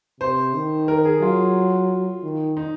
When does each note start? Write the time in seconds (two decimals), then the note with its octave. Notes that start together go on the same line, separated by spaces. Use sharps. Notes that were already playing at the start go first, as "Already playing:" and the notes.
0.21 C3 C5
0.54 D#3
0.88 A#4
1.05 G#4
1.22 F#3 F4
2.23 D#3
2.57 D#4